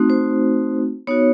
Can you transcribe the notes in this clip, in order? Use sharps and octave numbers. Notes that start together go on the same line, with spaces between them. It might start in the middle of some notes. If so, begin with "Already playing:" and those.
Already playing: A3 C4 D#4 F#4
C5
B3 D#4 F#4 C#5